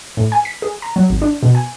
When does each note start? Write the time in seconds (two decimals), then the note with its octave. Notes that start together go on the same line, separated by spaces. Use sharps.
0.17 A2
0.32 G#5
0.45 B6
0.62 G#4
0.82 A#5
0.96 F#3
1.10 G#1
1.22 D4
1.43 B2
1.55 G#5